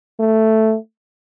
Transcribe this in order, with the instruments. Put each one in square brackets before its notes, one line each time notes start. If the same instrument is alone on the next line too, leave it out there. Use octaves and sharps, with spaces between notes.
[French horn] A3